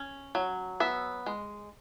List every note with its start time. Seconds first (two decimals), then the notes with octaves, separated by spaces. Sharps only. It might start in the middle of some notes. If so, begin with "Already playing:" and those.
Already playing: C#4
0.35 F#3
0.80 B3 E5
1.26 G#3